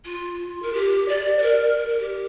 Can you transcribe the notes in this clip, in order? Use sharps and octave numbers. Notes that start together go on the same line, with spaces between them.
F4
A#4
G4
D5
C5
A#4
A#4
A#4
G4